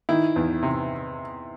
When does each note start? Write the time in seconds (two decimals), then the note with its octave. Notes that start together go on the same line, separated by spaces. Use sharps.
0.09 D#3 E4
0.36 E2
0.63 C3